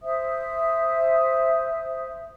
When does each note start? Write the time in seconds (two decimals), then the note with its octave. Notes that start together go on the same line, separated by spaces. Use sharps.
0.02 C5 E5 D#6